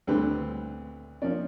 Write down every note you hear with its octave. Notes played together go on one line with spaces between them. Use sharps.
D2 D3 G3 C4 B4
F3 A#3 C#4 D5